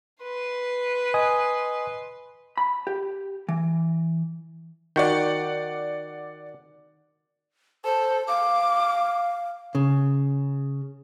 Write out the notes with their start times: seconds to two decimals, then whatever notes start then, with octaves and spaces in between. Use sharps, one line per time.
0.23 B4 C6
1.14 D#5 G#5 D#6
2.58 B5
2.87 G4
3.49 E3
4.96 D#3 F#4 D5 F#5 G6
7.85 A4 C5
8.28 F5 D6
9.75 C#3